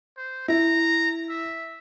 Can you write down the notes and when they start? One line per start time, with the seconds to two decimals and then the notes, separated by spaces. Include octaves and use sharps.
0.17 C5
0.48 E4 A#5
1.29 E5